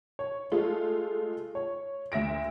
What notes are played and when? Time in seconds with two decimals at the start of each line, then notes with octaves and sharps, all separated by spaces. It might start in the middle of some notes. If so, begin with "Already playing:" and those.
0.19 C#5
0.52 G#3 A3 F4
1.55 C#5
2.12 D2 E5 A#6 D7